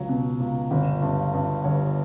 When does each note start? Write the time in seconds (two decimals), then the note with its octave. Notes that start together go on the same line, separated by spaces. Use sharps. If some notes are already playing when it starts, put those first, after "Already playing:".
Already playing: C#2 F#3
0.09 B2
0.40 C#2
0.71 G1
1.02 G2
1.33 G2
1.64 G1 C#5